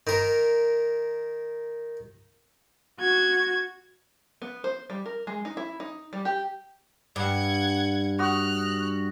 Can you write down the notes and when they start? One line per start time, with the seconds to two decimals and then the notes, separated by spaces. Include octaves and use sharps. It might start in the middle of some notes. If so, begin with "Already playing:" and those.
0.07 D#3 A#4
2.99 F#4 G#6
4.42 B3
4.64 C5
4.90 G3
5.06 A#4
5.27 G#3
5.45 D#4
5.57 E4
5.80 D#4
6.13 G3
6.25 G4
7.16 G2 F#5 G#6
8.19 F#4 C#6 D#6 F6 F#6